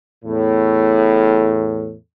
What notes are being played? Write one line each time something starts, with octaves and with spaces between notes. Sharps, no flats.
E2 A2